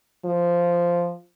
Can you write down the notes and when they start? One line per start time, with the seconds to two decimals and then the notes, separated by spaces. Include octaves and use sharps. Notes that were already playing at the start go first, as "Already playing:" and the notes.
0.25 F3